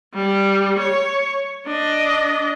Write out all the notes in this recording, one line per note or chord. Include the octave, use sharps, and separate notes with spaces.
G3
C#5
D4 D#5